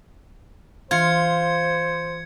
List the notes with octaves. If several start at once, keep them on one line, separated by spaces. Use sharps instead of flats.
E3 F4 C5 G#6 C#7